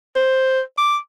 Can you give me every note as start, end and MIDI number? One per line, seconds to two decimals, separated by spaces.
0.16 0.60 72
0.78 0.97 86